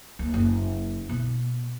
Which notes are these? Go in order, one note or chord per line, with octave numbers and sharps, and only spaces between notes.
D#2
F#1
B2